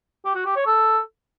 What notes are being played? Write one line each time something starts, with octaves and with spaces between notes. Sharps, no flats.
G4
F#4
G4
C#5
A4